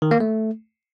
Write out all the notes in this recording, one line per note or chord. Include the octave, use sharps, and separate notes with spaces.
D#3
A#3
A3